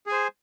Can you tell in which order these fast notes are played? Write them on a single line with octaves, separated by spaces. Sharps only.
G#4 G#5 C5